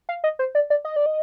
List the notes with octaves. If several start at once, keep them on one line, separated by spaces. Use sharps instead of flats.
F5
D#5
C5
D5
D5
D#5
D5
D#5